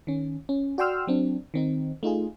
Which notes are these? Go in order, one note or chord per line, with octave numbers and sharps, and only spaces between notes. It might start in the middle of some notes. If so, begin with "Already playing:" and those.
D#3 C#4
C#4
F#4 D5 G5 C6 E6 F6
F#3 C4 D4
D#3 C4 D#4
A3 D#4 F4 G#4